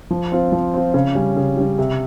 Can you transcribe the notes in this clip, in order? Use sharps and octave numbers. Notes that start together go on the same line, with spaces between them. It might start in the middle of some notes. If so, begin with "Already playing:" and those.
F3
C4 F4
F3
C4 F4
C#3
G3 C#4
C#3
G3 C#4
C3